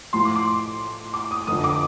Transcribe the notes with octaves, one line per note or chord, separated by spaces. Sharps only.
A2 F3 A3 C6
D6
D6
D6
D#6
F1 F2 D3 D#6
D6